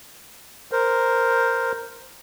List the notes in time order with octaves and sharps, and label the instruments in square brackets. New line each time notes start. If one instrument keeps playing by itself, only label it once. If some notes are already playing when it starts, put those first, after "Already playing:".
[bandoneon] A#4 C5